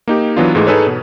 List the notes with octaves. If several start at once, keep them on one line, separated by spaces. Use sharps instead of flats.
A#3 D#4 G4
E3 F#3 B3 D4 F4
G#2 E3 G#3 A3
D#4 G#4 A4 B4 C#5
B2